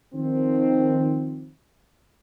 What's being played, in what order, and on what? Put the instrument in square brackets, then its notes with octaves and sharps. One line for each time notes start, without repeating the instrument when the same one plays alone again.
[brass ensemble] D#3 F3 C4